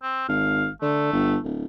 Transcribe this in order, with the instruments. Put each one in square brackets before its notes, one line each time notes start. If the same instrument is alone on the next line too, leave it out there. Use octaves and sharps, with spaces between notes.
[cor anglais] C4
[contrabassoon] G#1 [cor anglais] F5
[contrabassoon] D3 [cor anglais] A3
[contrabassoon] G1
D1